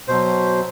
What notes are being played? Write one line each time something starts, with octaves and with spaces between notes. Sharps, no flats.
B2 F#3 C5